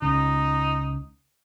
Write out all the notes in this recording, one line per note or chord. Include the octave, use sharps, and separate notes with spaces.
C#2 C#3 D#4